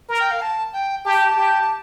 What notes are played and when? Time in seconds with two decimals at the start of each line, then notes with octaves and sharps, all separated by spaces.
0.09 A#4
0.20 G5
0.31 F5
0.41 A5
0.73 G5
1.05 G4 A5
1.37 G4